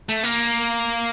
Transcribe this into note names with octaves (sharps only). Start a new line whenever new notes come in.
A3
A#3